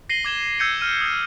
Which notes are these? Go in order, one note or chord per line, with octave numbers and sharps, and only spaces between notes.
A#6 C7 D#7 F#7 G7
D6 G#6 E7 G7
E6 G6 G#6 C#7 D#7
F6 D#7
D#6 G#6